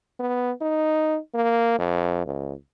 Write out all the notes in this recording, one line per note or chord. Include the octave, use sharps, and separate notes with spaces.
B3
D#4
A#3
F2
C#2